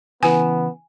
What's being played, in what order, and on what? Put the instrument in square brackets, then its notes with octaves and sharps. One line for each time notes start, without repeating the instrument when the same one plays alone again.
[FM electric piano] C#3 E3 [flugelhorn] B3 [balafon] G#5